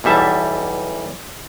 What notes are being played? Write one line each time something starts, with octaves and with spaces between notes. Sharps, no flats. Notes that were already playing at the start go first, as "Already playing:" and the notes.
B1 E2 G3 E5 A5